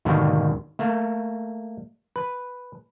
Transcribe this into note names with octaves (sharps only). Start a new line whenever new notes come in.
D#2 G#2 B2 D3 D#3
A3 A#3
B4